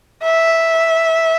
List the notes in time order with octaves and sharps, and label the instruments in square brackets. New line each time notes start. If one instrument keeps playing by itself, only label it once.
[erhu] E5